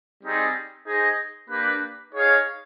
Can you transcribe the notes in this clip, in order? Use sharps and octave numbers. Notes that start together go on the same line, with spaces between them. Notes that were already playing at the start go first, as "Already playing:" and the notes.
G3 C4 D#4 G#4
D#4 G#4 C5 D#5
A#3 D4 G4 B4
D#4 G#4 C#5 F5